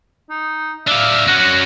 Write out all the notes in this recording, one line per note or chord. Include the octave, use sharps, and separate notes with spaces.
D#4
D4 E5 F5
C#4 F#4 F#5